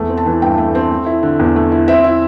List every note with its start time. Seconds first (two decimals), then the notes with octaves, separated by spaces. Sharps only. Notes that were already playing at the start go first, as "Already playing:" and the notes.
Already playing: E2 A3
0.09 C4
0.17 A5
0.26 E3
0.41 G2 G5
0.58 A3
0.75 C4
0.91 A3
1.06 E4
1.23 D3
1.39 E2
1.56 A3
1.72 E4
1.88 C4 E5
2.04 E4